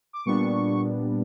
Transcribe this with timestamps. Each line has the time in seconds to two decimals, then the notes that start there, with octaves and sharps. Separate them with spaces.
0.13 D6
0.25 A#2 G3 B3 D4 C#6